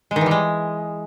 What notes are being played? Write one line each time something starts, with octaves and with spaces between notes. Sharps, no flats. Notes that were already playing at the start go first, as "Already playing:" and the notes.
G#3
D#3
E3
G3
G#3